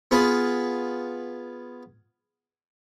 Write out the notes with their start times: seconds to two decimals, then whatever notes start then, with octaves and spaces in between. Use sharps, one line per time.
0.11 B3 F4 G#4 B4